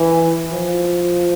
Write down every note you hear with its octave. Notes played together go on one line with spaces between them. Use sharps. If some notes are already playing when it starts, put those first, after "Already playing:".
Already playing: E3
F3